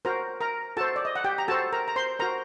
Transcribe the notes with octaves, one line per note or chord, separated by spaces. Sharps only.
F#4 A#4 C5 A#5
A#4 A#5
F#4 A4 C5 A5
D5
D#5
F#5
G4 G5
A#5
F#4 A4 C5 A5
A#4 A#5
A#5
C5 C6
F#4 A#4 C5 A#5